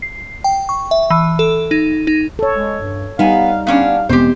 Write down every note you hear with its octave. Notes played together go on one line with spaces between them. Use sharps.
C7
G5
C#6
E5
E3
A4
D#4
D#4
A4 C#5
G#3
G2
G3 B3 D#4 F5 G#5
B3 C#4 D4 F5
E1 G#3 B3 C4 G4 C5